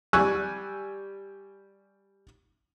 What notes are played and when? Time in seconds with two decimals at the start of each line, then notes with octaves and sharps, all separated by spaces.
0.13 G3 G#5 C#6 E6 F#6